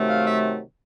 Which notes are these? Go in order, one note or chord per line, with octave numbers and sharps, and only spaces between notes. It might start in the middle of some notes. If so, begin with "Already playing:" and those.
Already playing: C3 D#3 F#3 A3
F5
E5